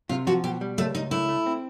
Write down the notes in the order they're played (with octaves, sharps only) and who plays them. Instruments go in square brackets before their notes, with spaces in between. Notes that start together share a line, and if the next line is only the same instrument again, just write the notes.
[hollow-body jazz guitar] C3 [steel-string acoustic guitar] F4
[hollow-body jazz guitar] F3 [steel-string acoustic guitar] F#4
[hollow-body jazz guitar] B2 [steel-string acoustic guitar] G4
[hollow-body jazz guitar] G3
[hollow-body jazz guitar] C#2 [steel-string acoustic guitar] A3
[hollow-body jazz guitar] C#2 [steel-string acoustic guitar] D#4
[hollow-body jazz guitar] A3 [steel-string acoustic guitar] E4
[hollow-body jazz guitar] A3
C4